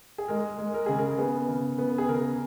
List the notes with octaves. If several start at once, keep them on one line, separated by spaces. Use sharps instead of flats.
G#4
G#3 A#4
G#3
A#4
C#3 G#4
A#4
B3 G#4
C#3
B3
G#4
C#3 A#4